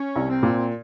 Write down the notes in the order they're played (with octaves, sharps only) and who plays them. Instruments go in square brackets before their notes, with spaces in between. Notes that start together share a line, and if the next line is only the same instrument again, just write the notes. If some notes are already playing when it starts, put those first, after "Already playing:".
Already playing: [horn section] C#4
[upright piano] C2
[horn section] C4
[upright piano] A#2